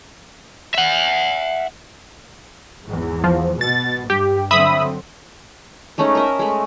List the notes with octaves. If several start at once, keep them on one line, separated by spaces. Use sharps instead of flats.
E5 F#5
G#1 E2
F3
B2 A6
G2 G4
D3 F#3 C4 E5 B5 D#6
G#3 A3 C#4 D#4
A#4 D#5 E5
G#3 A3